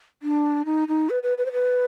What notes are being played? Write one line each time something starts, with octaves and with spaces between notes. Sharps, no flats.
D4
D#4
D#4
B4
B4
B4
C5
B4